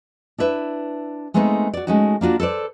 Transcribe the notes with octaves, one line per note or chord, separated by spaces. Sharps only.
D4 E4 B4 E5
G#3 A3 B3 C4 D4 D#4
F#4 D5
G#3 A3 C#4 D#4 F#4
A#3 D4 F4 F#4
A4 B4 C5 D5